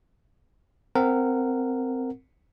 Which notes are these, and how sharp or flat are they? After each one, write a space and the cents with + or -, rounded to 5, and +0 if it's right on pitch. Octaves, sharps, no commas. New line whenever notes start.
C4 -10 A#4 -15 F#5 -20